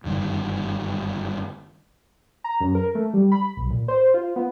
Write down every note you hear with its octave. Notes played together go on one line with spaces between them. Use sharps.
F#1 G2 D3 D#3
A#5
F#2
A#4
A3
G3
B5
B1
A#2
C5
F4
B3